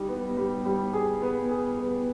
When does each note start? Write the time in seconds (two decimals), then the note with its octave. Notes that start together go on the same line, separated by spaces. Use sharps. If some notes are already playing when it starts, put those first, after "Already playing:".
Already playing: G3 D#4
0.08 B3
0.37 G3
0.65 G3
0.93 G#4
1.22 B3
1.51 G#4
1.79 B3